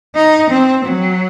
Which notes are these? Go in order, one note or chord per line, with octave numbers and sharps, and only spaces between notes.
D#4
C4
F#3